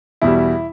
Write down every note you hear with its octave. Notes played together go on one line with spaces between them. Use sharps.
E2 B2 G3 E4